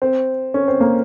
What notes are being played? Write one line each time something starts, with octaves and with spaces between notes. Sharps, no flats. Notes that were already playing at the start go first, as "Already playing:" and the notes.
C4
C#4
C4
A#3